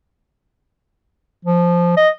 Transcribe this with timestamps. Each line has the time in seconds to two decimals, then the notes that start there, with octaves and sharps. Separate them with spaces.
1.45 F3
1.97 D#5